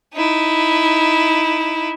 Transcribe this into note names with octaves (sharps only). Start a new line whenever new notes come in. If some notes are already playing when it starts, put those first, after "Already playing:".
D#4 E4